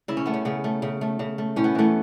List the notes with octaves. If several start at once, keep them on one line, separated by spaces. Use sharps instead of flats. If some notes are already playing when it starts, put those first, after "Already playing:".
C#3 E4
C#4
A3 B3
C#4
C#3 B3
A3
C#3
A3
C#3
A3
A2 C#4
B3
E3 A3 B3